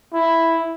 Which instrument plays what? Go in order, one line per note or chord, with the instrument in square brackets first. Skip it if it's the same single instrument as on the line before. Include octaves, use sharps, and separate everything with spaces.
[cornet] E4